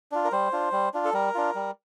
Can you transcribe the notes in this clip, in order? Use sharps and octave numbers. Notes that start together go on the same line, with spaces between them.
D4 F4
A#4
G3 C5
D4 F4
G3
D4 F4
A4
G3 A#4
D4 F4
G3